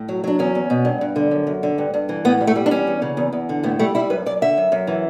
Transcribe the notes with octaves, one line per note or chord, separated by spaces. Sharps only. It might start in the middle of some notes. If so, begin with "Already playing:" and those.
Already playing: A2
F#3
F#3 D4
E2 C#4
E2
B2
G2
G2
D3
F#2
F#2
D3
G2
G2
E3
A2 B3
G3
A3
G3
D4
E2 C#4
E2
C#3
E2
E2
D3
A2 B3
G3 A3
G3 E4
F#2 B4
F#2 D5
D3 E5
F#2
F#2
E3